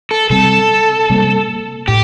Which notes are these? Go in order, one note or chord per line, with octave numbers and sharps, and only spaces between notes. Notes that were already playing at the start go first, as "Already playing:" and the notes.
A4
C3 G3 C4 A4
C3 G3 A#3
A2 G4